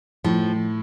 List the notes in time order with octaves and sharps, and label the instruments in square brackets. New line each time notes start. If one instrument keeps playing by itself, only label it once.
[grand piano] A2 [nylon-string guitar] F3